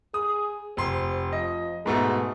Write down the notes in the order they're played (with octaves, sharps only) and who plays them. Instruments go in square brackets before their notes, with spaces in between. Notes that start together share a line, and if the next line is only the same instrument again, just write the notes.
[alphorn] G#4 [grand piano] D#6
[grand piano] F1 C6 [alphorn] C5
[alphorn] F3 [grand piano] D#5
[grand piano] G#2 B2 A3 [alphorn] G#4